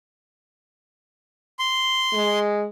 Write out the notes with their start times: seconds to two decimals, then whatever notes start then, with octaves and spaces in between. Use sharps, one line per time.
1.59 C6
2.13 G#3